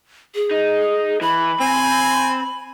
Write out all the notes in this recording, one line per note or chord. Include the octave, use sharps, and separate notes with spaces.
G#4
D#4
E3 B5
C4 G#5